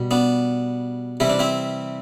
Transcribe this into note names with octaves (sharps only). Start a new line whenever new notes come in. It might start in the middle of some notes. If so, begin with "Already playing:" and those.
Already playing: B2 G3
B3 D4
C3 E3 G3 E4
D4
C4 E4